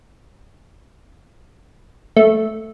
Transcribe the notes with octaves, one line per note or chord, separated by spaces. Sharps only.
A3